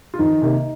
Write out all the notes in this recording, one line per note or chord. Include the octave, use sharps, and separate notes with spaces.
F4
F2 D#3 D#4
C3 D#3 A#3